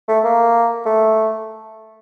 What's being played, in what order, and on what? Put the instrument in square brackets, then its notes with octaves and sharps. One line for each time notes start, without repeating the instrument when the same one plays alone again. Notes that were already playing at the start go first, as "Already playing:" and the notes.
[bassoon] A3
A#3
A3